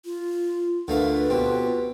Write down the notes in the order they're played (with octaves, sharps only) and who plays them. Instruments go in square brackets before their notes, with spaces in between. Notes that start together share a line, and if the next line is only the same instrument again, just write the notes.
[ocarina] F4
[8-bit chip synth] D2 F4 A#4 [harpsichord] D3 A3 F5 [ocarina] B4
[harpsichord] B2 C4 [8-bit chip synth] F4 G4